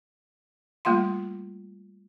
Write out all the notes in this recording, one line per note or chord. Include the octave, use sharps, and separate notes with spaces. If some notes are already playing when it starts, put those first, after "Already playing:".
G3 A3 A#3 F4 F5 C6